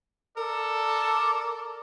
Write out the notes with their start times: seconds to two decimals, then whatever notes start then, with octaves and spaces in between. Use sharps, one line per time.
0.37 A4 A#4 D5